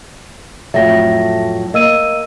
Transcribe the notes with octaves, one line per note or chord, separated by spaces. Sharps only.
F2 A2 F#3 E5 A#6
A#3 D#5 E6 D#7